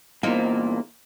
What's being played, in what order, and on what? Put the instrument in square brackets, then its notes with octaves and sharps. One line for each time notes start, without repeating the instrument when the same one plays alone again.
[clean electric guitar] E2 A#2 [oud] A#3 D#4 C5